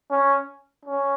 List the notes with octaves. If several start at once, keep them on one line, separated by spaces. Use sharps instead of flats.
C#4
C#4